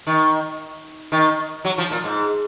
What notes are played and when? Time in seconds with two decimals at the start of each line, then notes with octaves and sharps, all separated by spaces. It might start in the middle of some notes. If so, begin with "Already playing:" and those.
0.07 D#3
1.12 D#3
1.65 F#3
1.78 F3
1.91 A#2
2.04 G#2